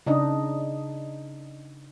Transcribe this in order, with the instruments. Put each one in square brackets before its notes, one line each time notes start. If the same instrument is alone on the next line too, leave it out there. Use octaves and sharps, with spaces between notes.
[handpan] C#3 D4 D#4 D#5